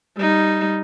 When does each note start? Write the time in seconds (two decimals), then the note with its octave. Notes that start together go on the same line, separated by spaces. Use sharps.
0.17 G3 D#4